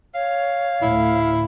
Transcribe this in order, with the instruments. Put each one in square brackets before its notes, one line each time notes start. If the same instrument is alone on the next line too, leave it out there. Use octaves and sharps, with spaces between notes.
[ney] C#5 [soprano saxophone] F5
[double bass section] D2 A2 [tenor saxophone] E4